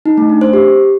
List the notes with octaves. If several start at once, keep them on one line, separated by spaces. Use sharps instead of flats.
D#4
A3
D4
C5
G4